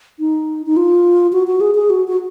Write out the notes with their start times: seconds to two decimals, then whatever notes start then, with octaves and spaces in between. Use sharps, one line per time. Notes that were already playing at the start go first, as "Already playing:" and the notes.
0.20 D#4
0.66 D#4
0.77 F4
1.33 F#4
1.47 F#4
1.61 G#4
1.75 G#4
1.90 F#4
2.08 F#4